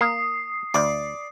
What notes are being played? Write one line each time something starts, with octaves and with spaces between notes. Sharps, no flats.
A#3 D#6 C7
D2 D5